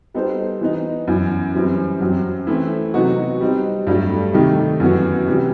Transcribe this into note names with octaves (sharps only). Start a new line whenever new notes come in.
G3 B3 D#4 A4 C5
E3 B3 D#4
F#2 E3 B3
F#2 E3 G3 C4
F#2 F#3 C4
E3 A3 C4 E4
C3 F#3 B3 D#4 F#4
G3 C4 D#4
G2 F#3 A3
C3 D#3 A3 D#4 G4
F#2 E3 B3 F#4
C3 E3 G3 B3